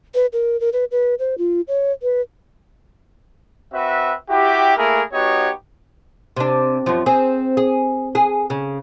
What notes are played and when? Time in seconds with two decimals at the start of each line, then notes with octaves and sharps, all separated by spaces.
0.15 B4
0.33 A#4
0.60 A#4
0.73 B4
0.91 B4
1.19 C5
1.38 F4
1.68 C#5
2.03 B4
3.73 C4 F#4 B4 E5
4.30 E4 F#4 G4
4.77 A3 A#3 E4 G#4 A#4
5.13 B3 D#4 F#4 G4 C#5
6.37 C3 D4
6.86 F#2 F3
7.06 C4 G#4
7.57 G#4
8.15 G#4
8.50 C#3